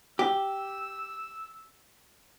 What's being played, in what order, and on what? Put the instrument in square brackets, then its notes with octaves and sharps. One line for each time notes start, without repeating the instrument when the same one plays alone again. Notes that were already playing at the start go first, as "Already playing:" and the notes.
[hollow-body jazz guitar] G4 [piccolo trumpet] E6